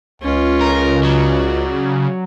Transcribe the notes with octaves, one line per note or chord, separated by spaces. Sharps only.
C#2 C#4 F4
C#3 A#4
F#3 D5